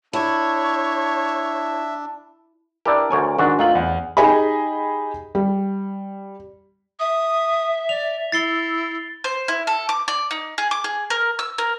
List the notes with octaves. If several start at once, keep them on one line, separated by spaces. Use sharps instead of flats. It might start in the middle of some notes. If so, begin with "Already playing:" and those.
D4 E4 C#5 E5
D4 E4 G4 A#4 D5
D2 C#5 G#5
G#2 D#3 D4 F#4
A3 C4 D#4 F4 F#7
E2
D#4 G4 G#4 D#5 G#5 B5
G3
E5 D#6
D5 F7
E4 A6 C7 G7
C5
E4
A4
D6
D5
D#4
G#4
D6
G#4
A#4
E6
A#4